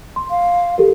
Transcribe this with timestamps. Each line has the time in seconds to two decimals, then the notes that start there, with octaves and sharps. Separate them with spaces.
0.16 C6
0.30 F5
0.78 G4 A4 A#4